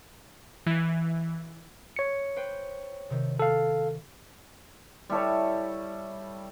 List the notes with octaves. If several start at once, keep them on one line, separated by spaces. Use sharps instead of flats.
E3
C#5 C#7
B4 C5 G5
C3 D#3
A4 F5
G3 E4 A4 C#5